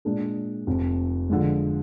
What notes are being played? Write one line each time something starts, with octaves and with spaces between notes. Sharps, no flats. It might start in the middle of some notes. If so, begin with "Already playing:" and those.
A#2 G#3 D4 G#4
F1 F2 C3
D3 F3 G#3